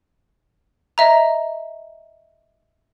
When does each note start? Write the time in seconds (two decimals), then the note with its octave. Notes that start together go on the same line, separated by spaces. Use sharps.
0.98 D#5 E5 A#5